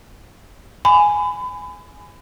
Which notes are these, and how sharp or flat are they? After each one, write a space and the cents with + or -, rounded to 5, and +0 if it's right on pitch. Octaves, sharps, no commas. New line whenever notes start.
G#5 +0 B5 +30